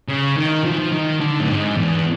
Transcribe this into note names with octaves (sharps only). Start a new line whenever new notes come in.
C#3
D#3
F3
E3
F3
D#3
D3
A2
G#2
E2